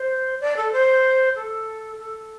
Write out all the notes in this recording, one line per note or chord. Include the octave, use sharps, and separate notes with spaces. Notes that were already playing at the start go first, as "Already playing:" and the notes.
Already playing: C5
D5
A4
C5
A4
A4